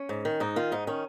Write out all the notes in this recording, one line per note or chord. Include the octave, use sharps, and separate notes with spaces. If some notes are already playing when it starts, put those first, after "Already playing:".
Already playing: C#4
G#2
D#3
G#2 D#4
D#3 F4
G#2 D#4
D#3 C#4